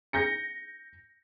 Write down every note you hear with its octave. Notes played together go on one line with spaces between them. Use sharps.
G6 A#6 C#7